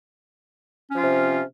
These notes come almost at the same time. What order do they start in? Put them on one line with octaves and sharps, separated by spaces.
C#4 F3 F4 C3